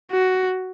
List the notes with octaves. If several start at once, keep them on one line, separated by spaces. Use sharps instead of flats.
F#4